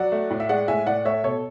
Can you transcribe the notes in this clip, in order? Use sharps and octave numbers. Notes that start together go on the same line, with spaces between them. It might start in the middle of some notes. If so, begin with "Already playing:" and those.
Already playing: F#3 D5 F#5
A3
A2
E5
G#3 D5 F#5
A2 E5 G#5
A2 D5 F#5
A3 C#5 E5
B2 A4 C#5